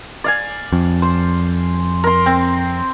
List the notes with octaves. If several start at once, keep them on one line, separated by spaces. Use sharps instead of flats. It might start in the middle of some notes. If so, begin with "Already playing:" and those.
D5 F5 G#5
F2
C5
A#4 C6
C4